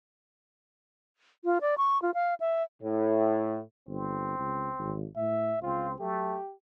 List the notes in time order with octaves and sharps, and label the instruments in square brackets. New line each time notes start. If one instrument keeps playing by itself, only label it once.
[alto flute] F4
D5
C#6
F4
F5
E5
[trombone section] A2
[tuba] G1 [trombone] C4
[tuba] C#2
G#1
[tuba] A2 [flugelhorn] E5
[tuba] C#2 [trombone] C4 [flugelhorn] F4
[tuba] F#3 [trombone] A3 [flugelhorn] G4